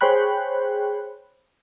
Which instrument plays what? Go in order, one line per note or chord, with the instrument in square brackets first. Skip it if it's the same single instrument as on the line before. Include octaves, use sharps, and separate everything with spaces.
[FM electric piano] G#4 C5 C#5 G5 B5 F#6